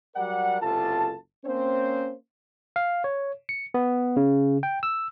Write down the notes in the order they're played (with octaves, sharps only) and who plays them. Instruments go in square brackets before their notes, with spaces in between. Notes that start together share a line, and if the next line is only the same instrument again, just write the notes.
[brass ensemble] F#3 G3 A#4 D5 F#5
F#1 C#2 C3 F4 A4 A5
A#3 C4 C#4 C5
[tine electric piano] F5
C#5
C#7
B3
C#3
G5
E6